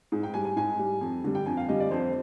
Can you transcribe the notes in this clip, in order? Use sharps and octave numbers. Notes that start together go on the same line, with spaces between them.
G#2 G#4
G5
G3 G#5
G#5
G#2 G#5
G3
F2
D3 G3
G5
F2 G#5
F5
D3 G3 D#5
D5
F2 C5